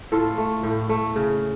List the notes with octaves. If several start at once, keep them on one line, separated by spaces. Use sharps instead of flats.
A2 F4 A4
A3
A2
A3
C#3